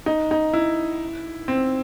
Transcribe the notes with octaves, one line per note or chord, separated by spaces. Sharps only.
D#4
D#4
E4
C4